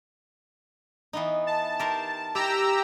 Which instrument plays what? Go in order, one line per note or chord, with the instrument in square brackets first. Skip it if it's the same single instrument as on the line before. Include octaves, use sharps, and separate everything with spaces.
[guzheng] E3 B3 D#4
[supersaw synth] A5
[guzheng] G4 A#4 C6
[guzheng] E4 [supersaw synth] G4 A#5 E6